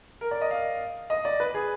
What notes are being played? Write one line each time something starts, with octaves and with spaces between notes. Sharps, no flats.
A#4
D5
D#5
F5
D#5
D5
B4
G#4